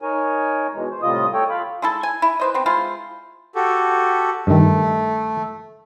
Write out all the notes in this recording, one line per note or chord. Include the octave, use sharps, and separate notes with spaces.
D#4 A#4 C#5 G#5
B2 E3 G#3
C5
A2 C3 G3 F4 D#5 D#6
A4 C#5 G5
F4 F5 B5
G#3 E4 A4
G#5
E4
B4 C5 D#5
B3 C4
G#3 E4 F4 C5
F#4 G4 A4
G2 D#3 A3